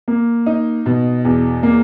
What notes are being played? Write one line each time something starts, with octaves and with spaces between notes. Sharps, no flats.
A#3
D#4
B2
E2
A#3